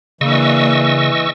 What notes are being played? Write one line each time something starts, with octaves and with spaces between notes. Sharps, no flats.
C#3 E3 A#3 D4 D#5 C#6 E6